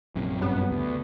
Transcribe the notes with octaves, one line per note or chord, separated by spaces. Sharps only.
A#1 F#2 C3
G2 G3 B3 C#4
D2 C#3